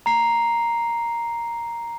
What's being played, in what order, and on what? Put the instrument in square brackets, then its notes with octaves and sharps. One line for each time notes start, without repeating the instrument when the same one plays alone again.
[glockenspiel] A#5 C7